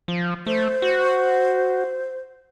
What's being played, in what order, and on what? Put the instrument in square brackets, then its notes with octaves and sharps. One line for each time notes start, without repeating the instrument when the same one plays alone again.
[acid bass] F3
[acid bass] A3 [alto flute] C5
[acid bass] F#4